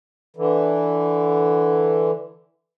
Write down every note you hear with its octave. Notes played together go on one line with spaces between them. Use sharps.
D3 E3